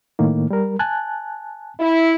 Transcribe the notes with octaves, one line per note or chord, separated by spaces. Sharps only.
A2 D#3 A#3
G3 A#4
G#5 A5 F#6
E4